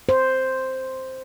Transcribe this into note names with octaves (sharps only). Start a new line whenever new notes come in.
C5